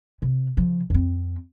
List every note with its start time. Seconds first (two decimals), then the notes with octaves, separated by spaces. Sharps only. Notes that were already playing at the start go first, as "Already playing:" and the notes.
0.22 C3
0.57 C#3 F3
0.90 F2 C4